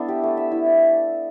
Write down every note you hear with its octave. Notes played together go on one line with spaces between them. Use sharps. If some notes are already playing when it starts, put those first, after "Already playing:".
Already playing: B3 D4 E4 A4
G4
A3
E5
E4
D5